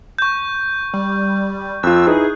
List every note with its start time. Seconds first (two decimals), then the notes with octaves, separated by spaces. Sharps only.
0.19 C#6 G6
0.93 G3
1.83 F2 F4 E6 F#6
2.07 D#4 E4 G#4 B4